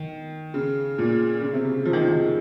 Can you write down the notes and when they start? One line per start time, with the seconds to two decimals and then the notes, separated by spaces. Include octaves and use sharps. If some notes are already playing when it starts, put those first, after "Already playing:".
Already playing: D#3
0.54 C#3
0.98 A#2
1.42 C#3
1.53 C3
1.65 C#3
1.85 F3
1.93 D#3
2.01 C#3
2.08 D#3